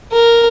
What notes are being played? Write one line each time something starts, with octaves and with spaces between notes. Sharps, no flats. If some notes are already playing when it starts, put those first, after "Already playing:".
A#4